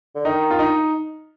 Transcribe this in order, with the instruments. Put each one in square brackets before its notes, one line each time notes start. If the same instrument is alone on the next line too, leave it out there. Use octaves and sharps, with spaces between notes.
[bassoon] D3
[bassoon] D#3 [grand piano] D#4
[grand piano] F4
D#4